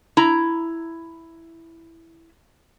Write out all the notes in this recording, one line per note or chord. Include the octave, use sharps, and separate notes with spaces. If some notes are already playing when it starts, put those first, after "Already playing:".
E4 A#5